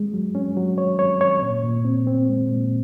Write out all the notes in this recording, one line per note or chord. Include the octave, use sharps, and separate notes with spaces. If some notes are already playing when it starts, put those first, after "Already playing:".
Already playing: G#3
F#3
C#4
F#3
C#5
C#5
C#5
A#2
A#2
C4
C4
G#3
A#2